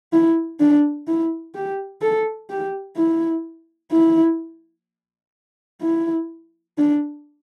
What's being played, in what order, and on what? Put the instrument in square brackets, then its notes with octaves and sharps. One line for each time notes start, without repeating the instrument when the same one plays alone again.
[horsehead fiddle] E4
D4
E4
G4
A4
G4
E4
E4
E4
D4